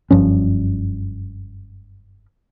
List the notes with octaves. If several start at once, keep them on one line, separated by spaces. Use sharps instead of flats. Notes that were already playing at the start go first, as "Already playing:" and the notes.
F#1 G2 F3 C#4